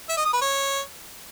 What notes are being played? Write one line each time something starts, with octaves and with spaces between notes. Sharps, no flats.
E5
D#5
D#6
B4
C#5